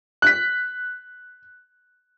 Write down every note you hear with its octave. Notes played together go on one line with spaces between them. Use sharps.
F#6 B6